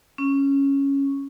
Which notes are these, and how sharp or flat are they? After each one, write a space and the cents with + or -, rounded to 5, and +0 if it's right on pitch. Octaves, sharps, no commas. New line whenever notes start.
C#4 +0